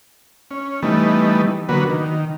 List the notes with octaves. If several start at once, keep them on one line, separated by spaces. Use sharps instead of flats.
C#4
E3 G3 A3 B3 D#4
D3 F#3 A#3 B3 F#4 B4
D#3